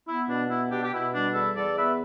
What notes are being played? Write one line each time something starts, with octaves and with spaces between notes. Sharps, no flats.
B3 E4
B2 D4
B3 E4
B2 D4 G4
G4
B2 E4
G3 D4
E2 E4 A4
E2 A4 D5
B3 B4 E5